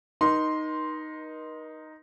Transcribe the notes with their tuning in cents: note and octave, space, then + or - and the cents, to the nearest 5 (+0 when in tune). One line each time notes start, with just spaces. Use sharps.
D#4 +0 A#4 +45 C6 +0